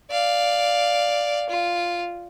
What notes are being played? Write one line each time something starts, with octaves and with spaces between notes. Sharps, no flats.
D5 F5
F4